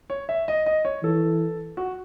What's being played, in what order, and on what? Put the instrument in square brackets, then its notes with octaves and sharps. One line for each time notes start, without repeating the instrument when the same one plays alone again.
[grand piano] C#5
E5
D#5
D#5
C#5
[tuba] E3 [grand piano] A4
[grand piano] F#4